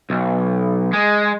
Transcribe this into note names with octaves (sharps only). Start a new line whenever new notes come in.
B1
G#3